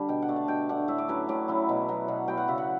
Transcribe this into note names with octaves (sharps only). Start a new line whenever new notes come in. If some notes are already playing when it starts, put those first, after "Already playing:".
Already playing: D3 G3 D4 A5
B2 G5
F#5
A3 D4
A5
B2 G5
A3 D4 F#5
A2 E5
D5
F#3 C#4 E4 B4
A2 D5
F#3 C#4 E4
B2
F#3 B3
B2 F#5
F#3 B3 G5
F#5
C#3 E5
F#5